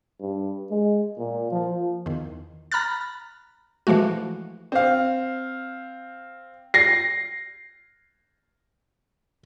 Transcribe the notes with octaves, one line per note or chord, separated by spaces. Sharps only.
G2
G#3
A#2
F3
E2 D#3
A#5 B5 F6 F#6 A6
E3 F3 G#3 A3 F#4
C4 F5
A#6 C7